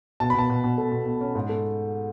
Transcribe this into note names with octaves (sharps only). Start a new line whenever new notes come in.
B2 A5
B5
B2 A5
B2
B2
A3
B2
B2
C#4
G#2
A3